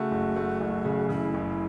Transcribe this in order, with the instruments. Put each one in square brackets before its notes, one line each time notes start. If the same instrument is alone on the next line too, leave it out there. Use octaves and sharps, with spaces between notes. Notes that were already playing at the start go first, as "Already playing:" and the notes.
Already playing: [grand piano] C#3 A3 [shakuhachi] F#4
[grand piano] F#1
A3
F#1
C#3
[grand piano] C#3 [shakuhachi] E4
[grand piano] F#1